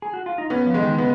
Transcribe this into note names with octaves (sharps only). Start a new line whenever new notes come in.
G#4
F#4
F4
D#4
B3 C#4
F3
G#3
D#3
C#3 B3